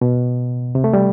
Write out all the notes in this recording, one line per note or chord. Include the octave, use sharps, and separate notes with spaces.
B2
C3
A3
G3